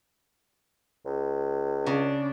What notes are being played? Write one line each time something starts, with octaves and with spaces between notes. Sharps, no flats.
C#2
C#3 D4